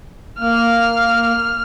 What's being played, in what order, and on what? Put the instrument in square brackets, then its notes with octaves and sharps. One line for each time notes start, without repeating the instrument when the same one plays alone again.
[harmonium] A#3 [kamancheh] F6